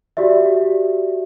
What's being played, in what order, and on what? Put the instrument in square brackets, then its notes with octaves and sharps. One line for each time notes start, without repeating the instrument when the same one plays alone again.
[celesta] F#4 G4 D5 E5